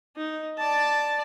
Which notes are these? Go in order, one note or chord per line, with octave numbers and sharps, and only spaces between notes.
D#4
D5 A5